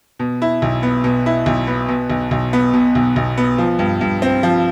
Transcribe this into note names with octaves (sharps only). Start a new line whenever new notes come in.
B2
E4
B1
B3
B2
E4
B1
B3
B2
B1
B1
B3
B2
B1
B1
B3
F3
G2
G2
C4
F3